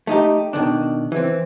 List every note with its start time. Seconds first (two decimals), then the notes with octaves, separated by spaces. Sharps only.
0.07 A3 D#4 G4
0.53 B2 D#3 D4
1.12 E3 C4